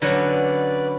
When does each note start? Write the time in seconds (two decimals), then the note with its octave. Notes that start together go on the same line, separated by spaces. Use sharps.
0.02 D3 F#3 C#4 B4 D5